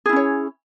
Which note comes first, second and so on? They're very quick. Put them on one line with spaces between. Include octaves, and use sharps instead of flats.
G#4 E4 C#4 C#5